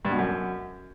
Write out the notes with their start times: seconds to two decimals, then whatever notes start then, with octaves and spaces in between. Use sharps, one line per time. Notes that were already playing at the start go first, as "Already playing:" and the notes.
0.05 G2
0.12 B2
0.19 F#2